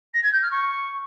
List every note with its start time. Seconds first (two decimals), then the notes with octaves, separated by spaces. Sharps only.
0.14 A#6
0.23 G#6
0.32 G6
0.42 F6
0.51 C#6